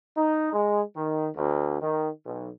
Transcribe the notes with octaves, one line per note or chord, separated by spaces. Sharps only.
D#4
G#3
D#3
D2
D#3
B1